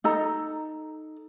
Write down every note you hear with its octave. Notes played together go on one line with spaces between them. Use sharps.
D#4 A4 A#5